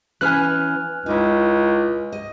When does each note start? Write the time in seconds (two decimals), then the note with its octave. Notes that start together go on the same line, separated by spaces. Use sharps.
0.21 E3 C#4 B4 G#5 F6 F#6
1.06 C#2 D#4 E4
2.12 D#5